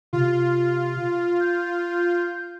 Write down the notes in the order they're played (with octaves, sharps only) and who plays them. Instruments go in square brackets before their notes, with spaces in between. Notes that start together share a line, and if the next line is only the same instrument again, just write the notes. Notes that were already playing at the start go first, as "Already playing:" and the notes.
[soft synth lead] C3 [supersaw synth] F4
[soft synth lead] G6